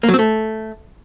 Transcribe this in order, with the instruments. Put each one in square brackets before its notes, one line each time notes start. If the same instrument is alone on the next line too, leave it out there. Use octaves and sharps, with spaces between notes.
[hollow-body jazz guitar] A#3
F#3
C4
A3